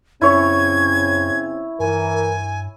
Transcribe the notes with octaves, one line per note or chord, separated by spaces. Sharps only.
F#2 C#3 C4 C#4 E4 C#5 C#6 G#6
G2 E3 A#4 G#5